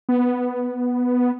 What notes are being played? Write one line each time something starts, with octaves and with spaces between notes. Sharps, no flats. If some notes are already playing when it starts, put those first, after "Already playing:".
B3